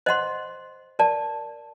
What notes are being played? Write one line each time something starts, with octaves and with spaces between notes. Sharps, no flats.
C5 D#5 F#5 C6
A#4 D5 A5